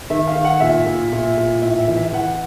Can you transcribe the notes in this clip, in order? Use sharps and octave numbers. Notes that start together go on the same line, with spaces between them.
D#3 E5
F5
D#3
F#5
A#2 E5
A#2
A#2
A#2
A2 E5
E5
E3
E5
E3 F#5